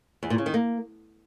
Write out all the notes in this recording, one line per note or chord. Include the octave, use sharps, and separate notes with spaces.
E2
A#2
C#3
D#3
A#3